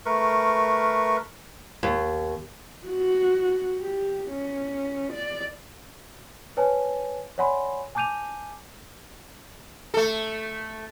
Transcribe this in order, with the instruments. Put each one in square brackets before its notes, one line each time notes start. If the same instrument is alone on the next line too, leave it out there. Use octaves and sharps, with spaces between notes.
[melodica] A3 A#4 B4 C#6
[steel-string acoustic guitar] D#2
[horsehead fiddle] F#4
G4
C#4
D5
[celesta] B4 C#5 G#5 A5
C#5 D5 F#5 G#5 B5 C6
G#5 A5 D6 G6 D#7 F7
[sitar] A3 A4